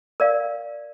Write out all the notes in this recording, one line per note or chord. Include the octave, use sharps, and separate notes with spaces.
A#4 D5 F5